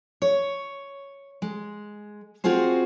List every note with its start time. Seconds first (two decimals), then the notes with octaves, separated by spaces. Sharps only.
0.22 C#5
1.42 G#3
2.44 C4 F4 F#4 G#4 C5